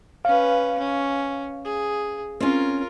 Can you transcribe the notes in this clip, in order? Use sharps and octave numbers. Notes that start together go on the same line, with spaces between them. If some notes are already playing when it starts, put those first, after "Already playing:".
C#4 B4 F5
C#4
G#4
C4 C#4 F4 A#4